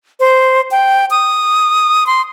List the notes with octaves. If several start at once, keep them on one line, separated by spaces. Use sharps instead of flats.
C5
G5
D#6
C6